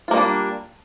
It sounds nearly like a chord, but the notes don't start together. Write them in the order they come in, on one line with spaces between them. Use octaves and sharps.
F4 A#3 G3 D4